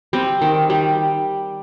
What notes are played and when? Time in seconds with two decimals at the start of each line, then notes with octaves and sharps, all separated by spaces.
0.13 G3 C4
0.42 D#3
0.70 G3